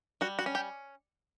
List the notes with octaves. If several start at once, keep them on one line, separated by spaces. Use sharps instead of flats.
G3 F#4
F#4
C#4
G4